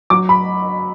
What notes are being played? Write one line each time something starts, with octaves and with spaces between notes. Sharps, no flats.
F#3 D6
B5